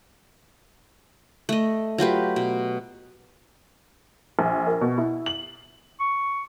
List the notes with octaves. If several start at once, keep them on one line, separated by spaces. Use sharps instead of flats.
A3 D#5
F#3 F4 G4 B4
B2
A#1
A#4
B2
E4
F#7
C#6